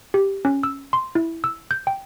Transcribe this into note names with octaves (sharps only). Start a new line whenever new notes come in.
G4
C#4
E6
C6
E4
E6
G6
G5